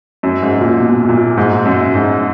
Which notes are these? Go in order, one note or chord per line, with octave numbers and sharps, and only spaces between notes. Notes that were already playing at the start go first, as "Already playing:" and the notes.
F#2
G#2
A#2
B2
A#2
G#2
F#2
G#2